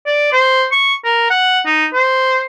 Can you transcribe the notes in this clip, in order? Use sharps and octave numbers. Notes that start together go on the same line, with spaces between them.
D5
C5
C#6
A#4
F#5
D#4
C5